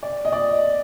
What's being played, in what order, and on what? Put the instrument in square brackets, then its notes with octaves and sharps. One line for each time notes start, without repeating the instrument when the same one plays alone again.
[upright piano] D5
D#5
D5